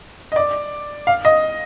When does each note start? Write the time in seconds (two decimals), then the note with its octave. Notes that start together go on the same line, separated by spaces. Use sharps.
0.32 D#5
0.36 D5
1.07 F5
1.25 D#5